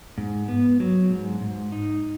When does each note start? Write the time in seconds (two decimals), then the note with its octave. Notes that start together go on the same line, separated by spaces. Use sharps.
0.18 G#2
0.48 B3
0.80 F#3
1.10 G#2
1.41 G#2
1.72 D#4